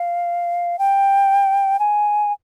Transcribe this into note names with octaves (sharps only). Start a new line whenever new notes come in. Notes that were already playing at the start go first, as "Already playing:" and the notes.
Already playing: F5
G5
G#5